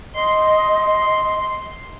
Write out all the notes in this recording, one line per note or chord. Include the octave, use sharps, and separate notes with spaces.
D#5 C6